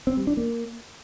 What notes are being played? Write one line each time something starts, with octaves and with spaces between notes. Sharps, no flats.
C4
G3
D4
A#3